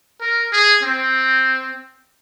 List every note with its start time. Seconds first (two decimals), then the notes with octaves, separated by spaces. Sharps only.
0.21 A#4
0.53 G#4
0.83 C4